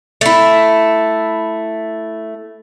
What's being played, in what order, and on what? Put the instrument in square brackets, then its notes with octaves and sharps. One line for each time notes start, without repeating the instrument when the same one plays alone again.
[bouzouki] A3 E4